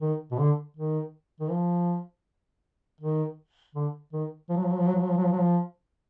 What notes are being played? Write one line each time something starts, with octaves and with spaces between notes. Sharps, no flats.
D#3
B2
D3
D#3
D#3
F3
D#3
D3
D#3
F3
F#3
F3
F#3
F3
F#3
F3
F#3
F3
F#3
F3
F#3
F3